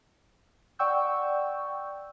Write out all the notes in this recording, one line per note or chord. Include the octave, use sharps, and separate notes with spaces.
D5 F#5 G5 C#6 E6 G6